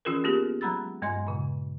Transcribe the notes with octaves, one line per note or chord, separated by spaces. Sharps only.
E3 C#4 F4 G#4 A#4
A#3 B3 F4 G4 G#4 A#4
F#3 G#3 A#5 B5 E6 A6
G2 G#3 D#5 G#5 C6
A#2 C#3